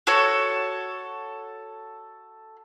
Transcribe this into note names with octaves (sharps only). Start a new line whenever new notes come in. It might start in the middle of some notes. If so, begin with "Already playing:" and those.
F#4 A4 C#5